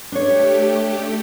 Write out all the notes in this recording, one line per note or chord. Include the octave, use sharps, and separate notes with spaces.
A3 D4 G4 C#5